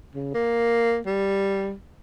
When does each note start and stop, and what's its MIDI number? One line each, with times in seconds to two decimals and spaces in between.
0.15 0.31 49
0.34 0.99 58
1.06 1.73 55